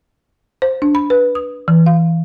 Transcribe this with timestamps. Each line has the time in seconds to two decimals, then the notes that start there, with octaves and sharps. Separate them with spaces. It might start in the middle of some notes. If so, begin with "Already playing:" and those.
0.62 C5
0.82 D4
0.95 B5
1.10 B4
1.35 D#6
1.68 E3
1.86 F5